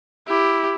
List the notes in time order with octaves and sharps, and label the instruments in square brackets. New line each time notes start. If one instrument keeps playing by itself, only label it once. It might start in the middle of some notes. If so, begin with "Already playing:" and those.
[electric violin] E4 [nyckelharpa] G4